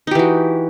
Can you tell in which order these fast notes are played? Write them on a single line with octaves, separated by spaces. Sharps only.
D#4 G4 E3 F#4